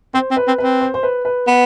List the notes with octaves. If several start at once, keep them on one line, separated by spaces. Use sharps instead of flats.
C4 C5
C4
B4
C4
C4 B4
C5
C5
B4
B4
B3